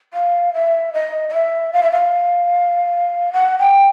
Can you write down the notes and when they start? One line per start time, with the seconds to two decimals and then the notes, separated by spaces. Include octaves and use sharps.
0.14 F5
0.54 E5
0.93 D#5
1.29 D#5
1.34 E5
1.73 F5
1.83 E5
1.92 F5
3.33 F#5
3.59 G5